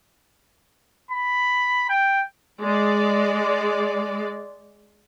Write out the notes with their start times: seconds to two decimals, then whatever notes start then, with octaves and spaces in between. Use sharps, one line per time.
1.11 B5
1.90 G5
2.61 G#3 D5